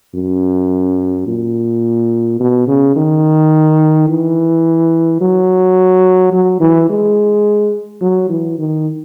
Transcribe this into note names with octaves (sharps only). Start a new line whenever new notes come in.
F#2
A#2
B2
C#3
D#3
E3
F#3
F#3
E3
G#3
F#3
E3
D#3